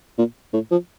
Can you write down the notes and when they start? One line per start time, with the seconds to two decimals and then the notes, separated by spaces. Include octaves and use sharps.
0.18 A#2
0.53 A2
0.71 F3